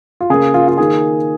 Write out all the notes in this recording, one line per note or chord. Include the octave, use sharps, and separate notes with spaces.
F4
C#3 A#3 G#4
F4
F4
D#3 A#3 G#4